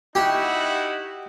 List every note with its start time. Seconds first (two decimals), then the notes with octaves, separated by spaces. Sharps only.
0.15 D#4 E4 F#4 G4